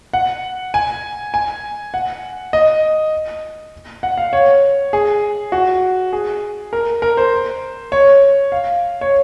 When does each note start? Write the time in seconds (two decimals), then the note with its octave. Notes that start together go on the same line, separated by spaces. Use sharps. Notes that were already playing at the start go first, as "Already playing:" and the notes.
0.14 F#5
0.74 G#5
1.34 G#5
1.94 F#5
2.53 D#5
4.03 F#5
4.18 F5
4.33 C#5
4.93 G#4
5.52 F#4
6.13 G#4
6.73 A#4
7.02 A#4
7.17 C5
7.92 C#5
8.52 F5
9.01 C#5